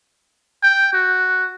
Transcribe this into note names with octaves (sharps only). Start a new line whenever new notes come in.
G5
F#4